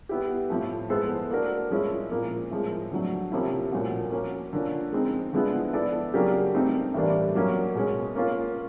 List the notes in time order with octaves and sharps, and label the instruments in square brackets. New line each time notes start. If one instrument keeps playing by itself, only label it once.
[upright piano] B3 E4 G4
A2 F3 A3
G#3 B3 E4 A4 C5
A#3 D4 F#4 A#4
F3 G#3 C#4 E4
A#2 F3 A#3
A2 F3 G#3
D3 F#3 A3
C3 F3 A#3 C#4 E4
A#2 F3 A3 C#4 F#4
A#3 C#4 F#4
D3 F3 A#3 C#4 F4
G#3 C4 D#4
D3 F3 G#3 B3 E4
B3 E4 A4 D5
C#3 F#3 A#3 D4 G4
A3 C4 D#4
A2 E3 G3 A#3 D4
F#3 A#3 C#4
B2 G#3 C#4
A#3 C#4 F4 A#4